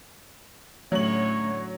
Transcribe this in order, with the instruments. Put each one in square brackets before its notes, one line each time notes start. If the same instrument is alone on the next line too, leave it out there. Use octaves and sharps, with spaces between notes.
[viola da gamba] A2 D3 C#4 [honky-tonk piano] F#3 F#7 [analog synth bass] A3 [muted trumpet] C#5